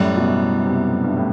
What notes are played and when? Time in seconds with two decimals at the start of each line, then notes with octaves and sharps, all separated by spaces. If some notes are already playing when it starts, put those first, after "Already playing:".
Already playing: F#2 A2 E3 G3 B3
0.17 B2
0.29 A2
0.66 C3
0.85 A2
1.04 G2
1.17 A2